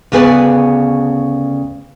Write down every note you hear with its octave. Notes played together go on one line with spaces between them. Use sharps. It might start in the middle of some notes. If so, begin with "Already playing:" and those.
D2 C#3 B3 G#4 B4 D5